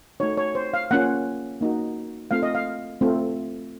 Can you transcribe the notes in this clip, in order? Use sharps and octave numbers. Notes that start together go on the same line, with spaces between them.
A3 D#4 F#4 C#5
C#5
C5
F5
A#3 C#4 F4 F#5
A#3 D#4 F#4
A3 C4 F4 F5
D#5
F5
A3 C4 F4